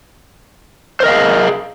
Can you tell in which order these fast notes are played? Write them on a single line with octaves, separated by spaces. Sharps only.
C5 A#4 D#5 F5 G#4